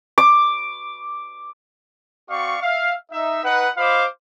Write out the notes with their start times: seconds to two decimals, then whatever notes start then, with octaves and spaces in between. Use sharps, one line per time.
0.18 D6
2.30 C4 F#4 D5 F5 C#6
2.62 E5 F5
3.12 D#4 E5
3.45 D#4 B4 F#5
3.77 F4 C5 D#5 F5 B5 D6